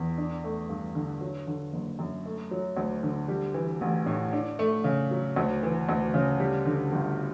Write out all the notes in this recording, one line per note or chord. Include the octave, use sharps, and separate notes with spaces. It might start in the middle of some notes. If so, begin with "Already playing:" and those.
Already playing: E2
D4
A3
G2
D3
F#3
D3
F#1
F#2
A3
F#3
D2
D3
G3
E3
A1
A2
D4
A3
C#3
F#3
D2
E3
D2
C#3
G3
D3
G1